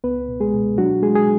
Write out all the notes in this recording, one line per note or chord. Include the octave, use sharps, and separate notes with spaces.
C#2 B3 B4
B2
G#3 G#4
B2
F#3 D4 F#4
G#3 G#4
G#4